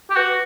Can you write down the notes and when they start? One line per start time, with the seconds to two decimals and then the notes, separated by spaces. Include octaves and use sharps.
0.10 G4
0.16 F#4 B4